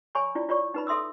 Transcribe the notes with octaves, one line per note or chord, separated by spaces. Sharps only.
C#5 G#5 B5 C#6
E4 F4 D5
F4 C#5 D5 C#6
D#4 B4 B5
A4 E5 C6 D#6 E6